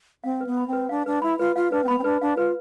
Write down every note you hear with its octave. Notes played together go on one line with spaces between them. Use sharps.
C4 F5
B4
B3
B5
C4
B4
D4 F5
D4 B4
E4 B5
F4 B4
F4 F5
D4 B4
C4
B3 B5
C4
D4 B4
D4 F5
F4 B4